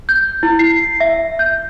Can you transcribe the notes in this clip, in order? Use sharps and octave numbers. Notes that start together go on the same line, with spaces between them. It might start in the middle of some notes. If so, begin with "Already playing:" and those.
G6
E4
C7
E5
G6